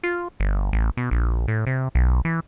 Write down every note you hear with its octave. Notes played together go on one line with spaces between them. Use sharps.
F4
G1
A1
B2
A#1
A2
C3
B1
E3